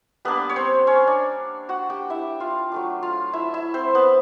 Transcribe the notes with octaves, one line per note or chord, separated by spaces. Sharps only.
G3 A#3 B3 D4 B4
C#5
C4 C5
C#4 C#5
D4 D5
F#4 F#5
G4 G5
E4 E5
F4 F5
F#3 A3 D4
F4 F5
E4 E5
E4 E5
C4 C5
B3 B4